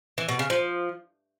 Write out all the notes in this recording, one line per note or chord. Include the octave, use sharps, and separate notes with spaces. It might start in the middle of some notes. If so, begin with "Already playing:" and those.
E3
B2
C#3
F3